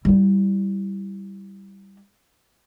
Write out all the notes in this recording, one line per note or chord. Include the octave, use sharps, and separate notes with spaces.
G3 E4